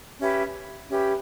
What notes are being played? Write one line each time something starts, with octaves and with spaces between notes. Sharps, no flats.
C#4 G4 B4 E5
C#4 G4 B4 E5